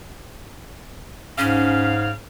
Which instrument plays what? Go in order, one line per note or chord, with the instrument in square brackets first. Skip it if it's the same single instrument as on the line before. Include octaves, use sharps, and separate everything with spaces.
[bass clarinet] G#2 [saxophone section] C#3 F5 [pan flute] C#4